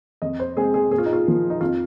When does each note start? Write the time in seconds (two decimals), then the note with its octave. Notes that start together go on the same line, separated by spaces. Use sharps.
0.22 F2 D#5
0.40 C5
0.57 C3 G#3 C4 G#4
0.74 G#4
0.91 A#2 G#4
0.98 F4
1.06 D#4
1.13 F4
1.26 F3 A#3
1.50 D#4
1.61 F2 F4